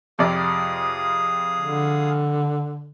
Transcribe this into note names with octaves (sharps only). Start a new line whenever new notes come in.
F2 C3 G#4 D5 F5 D#6
D3